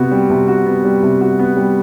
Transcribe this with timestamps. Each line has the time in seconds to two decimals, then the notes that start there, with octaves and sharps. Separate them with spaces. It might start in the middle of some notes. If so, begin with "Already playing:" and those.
Already playing: C3 B3 F#4
0.11 G3
0.30 C3
0.48 F#4
0.66 B3
0.84 G3
1.03 C3
1.21 F#4
1.39 B3
1.57 G3